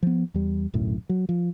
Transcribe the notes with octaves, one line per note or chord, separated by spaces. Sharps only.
F3 B3
E2 G3
D1 B1 F#2 A2
F#3
F3